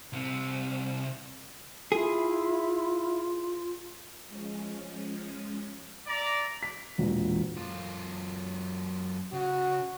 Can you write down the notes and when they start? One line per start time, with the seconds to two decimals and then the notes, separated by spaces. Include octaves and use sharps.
0.13 C2 C3
1.92 E4 F4 G#4
4.27 F3 G#3 C#4
6.07 D5 E5 A#5 B6
6.63 B6
6.98 E1 E2 A#2
7.57 F#2 F4
9.33 C#3 F#4